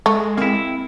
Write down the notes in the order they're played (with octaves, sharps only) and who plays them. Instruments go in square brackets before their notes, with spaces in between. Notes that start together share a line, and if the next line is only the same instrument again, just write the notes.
[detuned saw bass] G#3 [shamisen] A3
[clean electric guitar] A#3 E4 [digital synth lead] C4